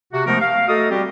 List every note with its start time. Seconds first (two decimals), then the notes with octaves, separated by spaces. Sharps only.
0.12 C3 F#4
0.26 F3 G#3 A3 B3 D#4 A#4
0.40 F5
0.68 A3 F#4 A4 D#5 A#5 D#6
0.90 G3 C4 F#4 G4